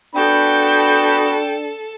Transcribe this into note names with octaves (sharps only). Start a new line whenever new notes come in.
B3 D4 F#4 A4 G5 B5